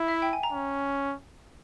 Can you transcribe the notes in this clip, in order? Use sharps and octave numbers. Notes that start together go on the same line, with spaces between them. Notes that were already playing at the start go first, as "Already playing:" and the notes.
Already playing: E4
E5
G5
G#5
A#5
C#4